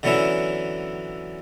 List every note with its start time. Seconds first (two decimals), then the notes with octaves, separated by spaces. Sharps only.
0.03 D3 E3 F#3 B3 C#4 E4